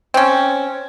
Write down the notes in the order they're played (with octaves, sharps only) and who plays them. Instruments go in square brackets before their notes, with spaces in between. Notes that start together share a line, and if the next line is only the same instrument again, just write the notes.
[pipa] C4 C#4